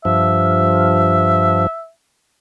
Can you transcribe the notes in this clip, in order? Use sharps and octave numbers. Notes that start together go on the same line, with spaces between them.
G2 F3 E5